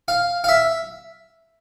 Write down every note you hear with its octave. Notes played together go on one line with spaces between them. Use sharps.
F5
F5
E5